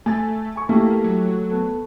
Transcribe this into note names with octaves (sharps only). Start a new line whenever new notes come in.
A3 G#5 A6
G#5 C#6
A3 A#3 E4 G4
F#3
B3 A4